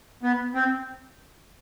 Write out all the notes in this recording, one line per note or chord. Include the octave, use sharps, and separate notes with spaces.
B3
C4